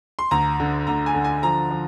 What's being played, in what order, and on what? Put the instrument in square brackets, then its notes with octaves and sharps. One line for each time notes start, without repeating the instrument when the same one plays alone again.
[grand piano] C6
D2 A#5
D3
D2 A#5
G#5
D3
G#5
F3 A#5
F3